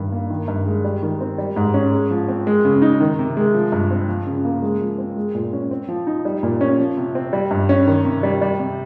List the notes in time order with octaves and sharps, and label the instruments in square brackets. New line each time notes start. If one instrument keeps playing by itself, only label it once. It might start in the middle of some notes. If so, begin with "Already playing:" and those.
Already playing: [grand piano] G2 D#3
A#3
D#3
G2
G#3
G3
D#3
C4
G3
G#2
C#4
G#3
F3
C4
G#3
C#3
D#4
D#3
C3
G#3
F3
G2
C4
F3
C#3
A#3
G#3
F3
C4
G#3
A#2
C#4
C4
F3
D#4
G3
A#2
C#4
F3
C3
C4
G3
G2
C#4
D#3
C3
G3
G3
C3